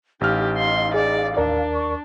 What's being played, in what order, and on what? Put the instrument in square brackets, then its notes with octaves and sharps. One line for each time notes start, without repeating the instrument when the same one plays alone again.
[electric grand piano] A1 F6 [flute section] D#4 F5 [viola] G4
[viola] C6
[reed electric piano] G#4 [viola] D5
[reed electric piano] D#2 A#4 D5 [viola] D4
[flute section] C#6